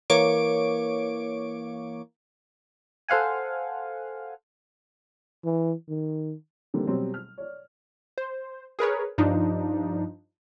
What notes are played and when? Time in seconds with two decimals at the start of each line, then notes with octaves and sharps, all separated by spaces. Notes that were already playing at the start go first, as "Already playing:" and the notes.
0.10 E3 A#3 C#5 C#6 D6 D7
3.09 A4 C5 F5 F#5 G#5
5.45 E3
5.89 D#3
6.74 D3 D#3 G3 A#3 C4
6.87 B2 F#3 G3 C4
7.14 F6
7.38 C#5 D5
8.18 C5
8.79 G#4 A#4 B4 C#5
9.18 G2 F3 D4 D#4